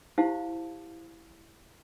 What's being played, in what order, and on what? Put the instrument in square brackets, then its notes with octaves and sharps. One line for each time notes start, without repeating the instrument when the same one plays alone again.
[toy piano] E4 G4 C5 F5 A5